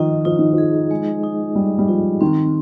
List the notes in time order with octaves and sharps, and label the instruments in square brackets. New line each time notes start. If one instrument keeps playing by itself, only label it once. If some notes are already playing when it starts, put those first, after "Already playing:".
Already playing: [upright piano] D#3 F3 [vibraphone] D#4 D#5
[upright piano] F3 [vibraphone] D#4
[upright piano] D#3
F3
[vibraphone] G#4
G#3
D#4
[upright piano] G3 [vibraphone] D#5
[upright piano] G3
[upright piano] F3 [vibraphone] D#4
[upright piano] D#3 [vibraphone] C4